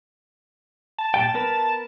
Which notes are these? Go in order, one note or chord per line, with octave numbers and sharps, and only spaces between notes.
A5
A#2 G3 G5
B3 A#4 B4